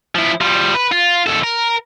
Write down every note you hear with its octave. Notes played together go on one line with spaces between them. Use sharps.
F3 E4
F3 G3
B4
F4
D#2 A4
A#4